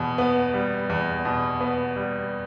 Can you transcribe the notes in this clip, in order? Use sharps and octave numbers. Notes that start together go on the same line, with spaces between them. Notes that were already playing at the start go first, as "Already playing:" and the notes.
Already playing: E2 B2
B3
G3
E2
B2
B3
G3